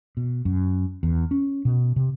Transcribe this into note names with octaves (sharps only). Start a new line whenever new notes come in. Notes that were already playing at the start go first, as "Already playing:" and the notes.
B2
F#2
E2
C#4
B2
C3